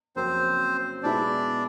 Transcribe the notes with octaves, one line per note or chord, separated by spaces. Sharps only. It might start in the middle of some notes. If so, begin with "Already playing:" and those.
F2 C#3 F#3 A#3 C4 C#4 C5
B2 G#3 B3 D4 E4 D5